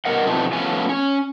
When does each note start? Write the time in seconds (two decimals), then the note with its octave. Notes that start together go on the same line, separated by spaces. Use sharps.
0.05 B2 A#4 D#5 F#5
0.27 B2 F3 A3 C4 D4 D#4
0.53 F3 A3 B3 C#4 G#5
0.89 C#4